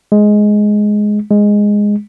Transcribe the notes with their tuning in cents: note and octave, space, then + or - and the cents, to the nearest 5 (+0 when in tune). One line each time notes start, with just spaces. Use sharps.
G#3 +10
G#3 -5